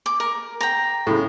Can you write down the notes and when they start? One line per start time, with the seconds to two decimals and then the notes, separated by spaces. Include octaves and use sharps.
0.06 D6
0.20 A#4
0.61 G5 A#5
1.07 A2 C#3